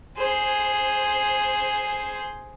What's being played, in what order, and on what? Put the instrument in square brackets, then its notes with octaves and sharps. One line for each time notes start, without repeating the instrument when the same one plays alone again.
[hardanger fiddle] G#4 C5